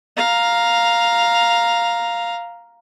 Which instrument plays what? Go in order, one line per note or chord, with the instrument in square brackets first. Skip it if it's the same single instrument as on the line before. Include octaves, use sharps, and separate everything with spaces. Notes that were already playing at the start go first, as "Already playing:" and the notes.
[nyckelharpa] F5 A#5